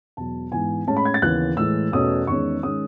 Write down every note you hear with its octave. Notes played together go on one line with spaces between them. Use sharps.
E2 B2 F#3 A5
G#2 E3 B3 G#5
A2 G#3 C#4 A5
B5
G#6
A6
D#2 C#3 E3 B3 F#6
A2 E3 G#3 E6
E2 B2 A3 C#4 D#6
E2 D#3 G#3 C#4 C#6
D#3 G#3 C#4 D#6